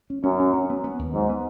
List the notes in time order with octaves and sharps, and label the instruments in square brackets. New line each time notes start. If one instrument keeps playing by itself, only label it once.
[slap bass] C#4
[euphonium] F#2 [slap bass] C#4
[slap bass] C#4
C#4
B3
B3
D#2
[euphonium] G#2 [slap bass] F#3
[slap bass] B3